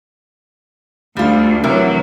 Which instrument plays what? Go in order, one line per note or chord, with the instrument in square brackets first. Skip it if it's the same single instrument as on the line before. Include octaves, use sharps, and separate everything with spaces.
[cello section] D2 [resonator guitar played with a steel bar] G3 F4
[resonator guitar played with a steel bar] C3 A#4 [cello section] E3 F#3